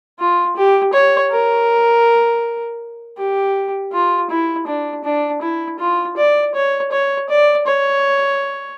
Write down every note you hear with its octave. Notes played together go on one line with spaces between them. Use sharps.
F4
G4
C#5
A#4
G4
F4
E4
D4
D4
E4
F4
D5
C#5
C#5
D5
C#5